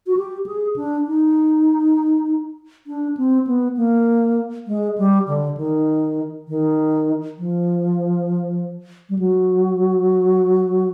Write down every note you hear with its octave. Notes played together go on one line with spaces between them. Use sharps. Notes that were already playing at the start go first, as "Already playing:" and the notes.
F#4
G4
G#4
D4
D#4
D4
C4
B3
A#3
G#3
G3
D3
D#3
D#3
F3
G3
F#3